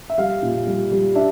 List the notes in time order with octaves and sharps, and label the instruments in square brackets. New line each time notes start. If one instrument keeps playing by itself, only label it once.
[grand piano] E5
G3 F5
A#2
G3
G3
D4 E5